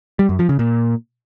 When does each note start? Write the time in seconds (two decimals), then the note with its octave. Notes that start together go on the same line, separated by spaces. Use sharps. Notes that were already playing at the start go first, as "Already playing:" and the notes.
0.19 G3
0.29 F#2
0.39 F3
0.49 C#3
0.59 A#2